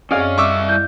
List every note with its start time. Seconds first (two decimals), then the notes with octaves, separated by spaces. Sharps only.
0.11 F#2 C4 C#4 G#4 D5 D#5 F5
0.38 G3 E5 C#6 D6 E6
0.69 E4 G6